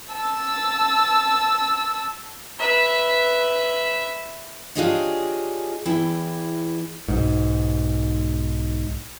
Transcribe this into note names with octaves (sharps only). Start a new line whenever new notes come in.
A5 E6
B4 E5
D4 F4 G4 G#4 C#5 D#5
E2 E4 G5
B1 G#2